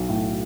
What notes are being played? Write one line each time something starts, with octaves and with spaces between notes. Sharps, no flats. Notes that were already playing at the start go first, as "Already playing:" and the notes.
Already playing: B1 F#3
A2